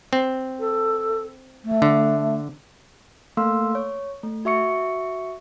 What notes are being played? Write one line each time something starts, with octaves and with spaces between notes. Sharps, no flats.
C4
A4
A3
D3
A3 A#3 A4 F5 C6 E6
C#5
A3
F#4 E5 C#6 C#7